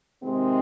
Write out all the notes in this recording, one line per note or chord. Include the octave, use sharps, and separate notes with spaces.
C3 D#3 G#3 C4